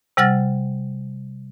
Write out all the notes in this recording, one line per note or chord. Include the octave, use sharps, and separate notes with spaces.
C3 G3 F#5 F6 A6 A#6